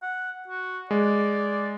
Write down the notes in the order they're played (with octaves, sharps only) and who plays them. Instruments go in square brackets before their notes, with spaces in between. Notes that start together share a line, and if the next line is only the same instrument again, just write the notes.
[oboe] F#5
F#4
[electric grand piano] G#3 [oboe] D5